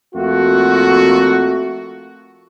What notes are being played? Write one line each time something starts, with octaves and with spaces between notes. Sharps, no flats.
F2 A3 A#3 F4 F#4